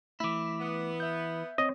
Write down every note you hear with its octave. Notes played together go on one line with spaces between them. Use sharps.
E3 A3 E4 D6
B3
E5 G6
C4 C#5 D#5